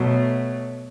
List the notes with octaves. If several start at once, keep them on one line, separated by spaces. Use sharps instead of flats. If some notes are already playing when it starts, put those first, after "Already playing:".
Already playing: B2 F#3 A3